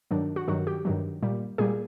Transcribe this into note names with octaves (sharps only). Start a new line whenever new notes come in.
G2 D#3 F#3 D4
F#4
G2 D#3 F#3 F#4
G4
G2 D#3 F#3
A#2 G3
A#2 G3 G#4